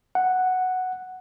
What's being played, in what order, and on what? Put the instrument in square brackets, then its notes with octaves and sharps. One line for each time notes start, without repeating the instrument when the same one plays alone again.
[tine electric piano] F#5